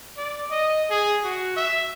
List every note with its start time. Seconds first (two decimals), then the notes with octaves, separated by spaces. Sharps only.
0.17 D5
0.51 D#5
0.90 G#4
1.24 F#4
1.56 E5